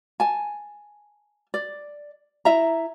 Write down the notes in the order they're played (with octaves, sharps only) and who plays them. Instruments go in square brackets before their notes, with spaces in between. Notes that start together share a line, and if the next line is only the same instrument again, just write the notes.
[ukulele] G#5 A5
D5
E4 E5 A#5